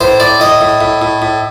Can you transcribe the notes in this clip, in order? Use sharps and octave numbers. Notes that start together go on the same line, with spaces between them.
A2 C5
A2 D5
A2 D#5
A2
A2
A2
A2